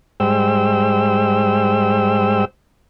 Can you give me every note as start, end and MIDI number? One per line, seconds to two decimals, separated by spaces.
0.20 2.45 44
0.20 2.45 55
0.20 2.45 56
0.20 2.45 72
0.20 2.45 79
0.20 2.45 88